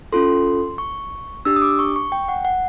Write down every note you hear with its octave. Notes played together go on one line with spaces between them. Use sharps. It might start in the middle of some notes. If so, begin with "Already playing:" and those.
C#4 F4 A4 C6
C#6
D4 G4 E6
D#6
D6
C#6
C#6
G5
F#5
F#5